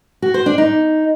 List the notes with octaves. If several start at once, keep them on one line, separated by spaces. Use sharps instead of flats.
F#4
C5
D4
D#4